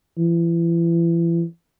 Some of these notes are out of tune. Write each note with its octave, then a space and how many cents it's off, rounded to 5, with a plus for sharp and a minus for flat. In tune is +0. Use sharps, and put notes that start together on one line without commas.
E3 +35